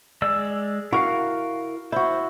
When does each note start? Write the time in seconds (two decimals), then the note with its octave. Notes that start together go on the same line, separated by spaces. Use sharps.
0.22 G#3 D5 E6
0.93 E4 F#4 A#4 F5
1.92 E4 F#4 C5